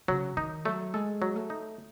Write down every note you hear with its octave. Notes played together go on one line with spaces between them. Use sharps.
C#3 F#3
D#3 D#4
F#3 A3
G#3 A4
F#3
A3
D#4